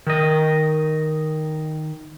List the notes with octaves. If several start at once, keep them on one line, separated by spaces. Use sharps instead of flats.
D#3 D#5